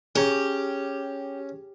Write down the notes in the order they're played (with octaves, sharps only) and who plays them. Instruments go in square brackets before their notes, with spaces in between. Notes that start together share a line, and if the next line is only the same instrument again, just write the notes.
[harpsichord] C#4 A#5 [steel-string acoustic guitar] G4 [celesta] G#4